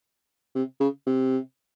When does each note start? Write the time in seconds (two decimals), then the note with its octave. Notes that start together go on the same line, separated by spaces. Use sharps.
0.55 C3
0.80 C#3
1.07 C3